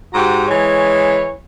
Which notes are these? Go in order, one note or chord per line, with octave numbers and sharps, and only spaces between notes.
G#2 F#4 G4 A#5
E3 G#3 C#5